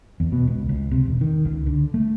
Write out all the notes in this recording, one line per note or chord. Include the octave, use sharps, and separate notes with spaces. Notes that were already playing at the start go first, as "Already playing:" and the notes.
E2
B2
C#2
C#2
C3
E1
D#3
C#2
D3
A3